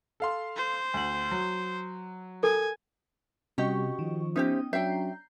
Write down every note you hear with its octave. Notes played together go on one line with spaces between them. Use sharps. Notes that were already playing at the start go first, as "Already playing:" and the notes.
A4 F5 C6
C5
D2 F#7
F#3
A4 A#4 G#5
C3 G3 C#4 F#4 G4 D#5 C#6
D#3 F3
B3 C#4 D#4 G4 C5 E5 G5 D#6
F#3 C#4 D4 E5 G5 A#5 G6 C7